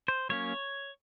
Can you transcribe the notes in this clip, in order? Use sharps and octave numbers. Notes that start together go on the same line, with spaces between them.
C5
F#3 A#3 C#4 C#5